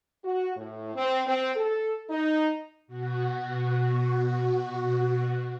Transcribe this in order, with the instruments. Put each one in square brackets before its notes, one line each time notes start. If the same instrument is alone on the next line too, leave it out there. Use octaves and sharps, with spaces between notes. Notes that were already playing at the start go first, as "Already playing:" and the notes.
[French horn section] F#4
A2
C4
C4
A4
D#4
[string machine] B2 F#4